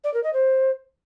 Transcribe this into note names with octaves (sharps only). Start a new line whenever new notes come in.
D5
A#4
D#5
C5